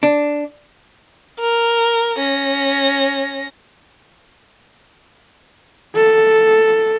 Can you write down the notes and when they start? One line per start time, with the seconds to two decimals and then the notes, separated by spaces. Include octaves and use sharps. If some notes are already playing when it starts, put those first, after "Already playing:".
0.03 D4
1.40 A#4
2.18 C#4 A#6
5.96 A4